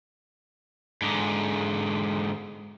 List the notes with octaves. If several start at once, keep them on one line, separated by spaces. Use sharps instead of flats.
G#2 D3